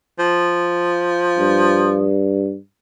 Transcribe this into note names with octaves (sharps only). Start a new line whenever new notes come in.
F3
G2